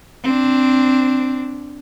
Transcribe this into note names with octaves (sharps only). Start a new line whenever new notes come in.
C4 D4